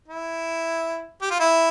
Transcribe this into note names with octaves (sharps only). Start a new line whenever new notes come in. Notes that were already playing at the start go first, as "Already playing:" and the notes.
E4
G4
F4
E4